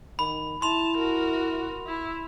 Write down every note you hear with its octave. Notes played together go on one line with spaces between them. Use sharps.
D#3 B5
E4 A5 C6 F7
F#4 A#4
E4